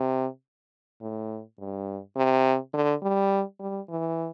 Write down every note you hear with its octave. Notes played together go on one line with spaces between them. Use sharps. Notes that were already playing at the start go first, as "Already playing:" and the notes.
Already playing: C3
A2
G2
C3
D3
G3
G3
E3